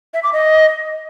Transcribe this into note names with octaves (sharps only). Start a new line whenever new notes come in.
E5
D6
D#5